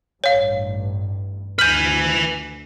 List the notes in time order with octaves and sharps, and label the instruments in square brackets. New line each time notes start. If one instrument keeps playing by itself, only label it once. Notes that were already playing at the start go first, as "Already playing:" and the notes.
[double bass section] A1 G2 [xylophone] C#5 F5
[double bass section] D2 [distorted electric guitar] B4 G#5 [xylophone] F6 G6